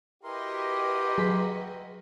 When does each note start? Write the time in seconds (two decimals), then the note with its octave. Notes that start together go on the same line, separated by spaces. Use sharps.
0.24 E4 F#4 G4 A#4 B4 D#5 C6
1.18 F#3 G#4 B6